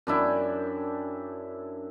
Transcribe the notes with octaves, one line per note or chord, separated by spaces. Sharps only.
F#2 D4 E4 G5